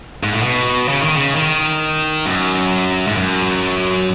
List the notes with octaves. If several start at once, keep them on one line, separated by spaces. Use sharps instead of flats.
G#2
A2
B2
C#3
D#3
C#3
D#3
F#2
G#2
F#2